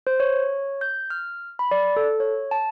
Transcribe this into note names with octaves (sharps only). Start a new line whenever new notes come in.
C5
C#5
G6
F6
B5
D5
A4
C#5
A5